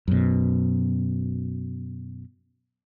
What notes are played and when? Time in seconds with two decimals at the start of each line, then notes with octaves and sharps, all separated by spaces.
0.08 F#2 B2